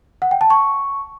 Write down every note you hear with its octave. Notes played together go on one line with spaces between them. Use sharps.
F#5
G5
A5
C#6